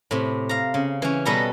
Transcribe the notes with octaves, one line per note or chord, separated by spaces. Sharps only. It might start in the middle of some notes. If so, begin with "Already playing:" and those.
A2 C3
F5 A#5
C#3
E3 C#4
B2 G3 A4 B4 D#5 A#5